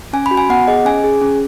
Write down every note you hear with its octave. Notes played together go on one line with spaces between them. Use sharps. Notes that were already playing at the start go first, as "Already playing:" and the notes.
C#4 G#5
B5
F#4
G#5
B3 F#5
G#4 D#5
C#4 G#5
G#4
C#4